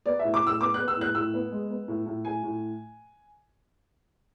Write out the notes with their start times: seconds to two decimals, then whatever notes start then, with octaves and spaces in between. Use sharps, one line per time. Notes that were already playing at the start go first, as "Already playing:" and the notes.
0.06 B3 D5
0.19 A2 E5
0.34 D6
0.42 A2 E6
0.60 B3 D6
0.74 B3 F#6
0.88 E6
0.97 A2 F#6
1.15 A2 E6
1.34 B3
1.52 G#3
1.70 B3
1.88 A2
2.06 A2
2.25 A2 G#5
2.43 A2